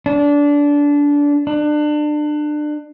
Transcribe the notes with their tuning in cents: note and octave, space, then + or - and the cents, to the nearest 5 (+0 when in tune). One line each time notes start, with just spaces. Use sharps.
D4 -20
D4 +30